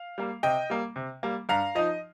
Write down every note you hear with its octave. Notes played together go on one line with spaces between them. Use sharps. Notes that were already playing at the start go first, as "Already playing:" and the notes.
Already playing: F5
G3 A#3
C3 D#5 G5
G3 A#3
C3
G3 A#3
G2 F5 A#5
F3 D#4 D#5